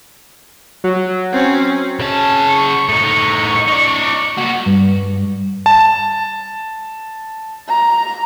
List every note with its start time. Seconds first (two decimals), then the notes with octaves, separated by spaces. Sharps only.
0.84 F#3
1.33 C4 C#4
1.99 C#3 C#4 A5
2.49 C#6
2.89 A2 D#4 C#6
3.68 D#4 D5
4.37 A#3 F#4
4.66 G2
5.66 A5
7.68 A#5